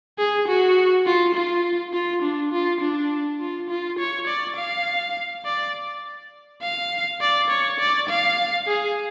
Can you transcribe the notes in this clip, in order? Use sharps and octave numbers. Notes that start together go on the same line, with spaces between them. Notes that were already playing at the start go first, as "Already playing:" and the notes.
G#4
F#4
F4
F4
F4
D4
F4
D4
F4
F4
C#5
D5
F5
D5
F5
D5
C#5
D5
F5
G#4